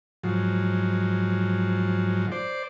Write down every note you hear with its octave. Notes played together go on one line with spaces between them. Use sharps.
G#2 F3 F#3
C5 D5